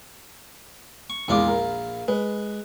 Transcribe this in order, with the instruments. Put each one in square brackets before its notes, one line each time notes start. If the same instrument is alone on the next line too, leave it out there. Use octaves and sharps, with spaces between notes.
[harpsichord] C#6
[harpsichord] A#1 E4 F4 [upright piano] E2 G#3 D6
[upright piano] A#4
[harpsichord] G#3 [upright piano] B4